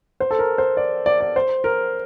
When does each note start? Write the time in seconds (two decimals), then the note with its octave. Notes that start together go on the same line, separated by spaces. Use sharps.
0.20 C5
0.31 A4
0.39 A#4
0.58 C5
0.77 D5
1.06 D5
1.21 D5
1.36 C5
1.64 A#4